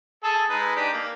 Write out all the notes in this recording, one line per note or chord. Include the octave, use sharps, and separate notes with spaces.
G#4 A4 A5
G#3 D#4 B4
D4 D#4 G4
A#3